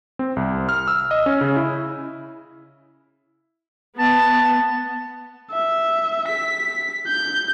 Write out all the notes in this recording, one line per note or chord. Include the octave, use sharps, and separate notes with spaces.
C4
C2
F6
E6
D#5
C#4
C#3
E4
B3 A5
E5
B6
G6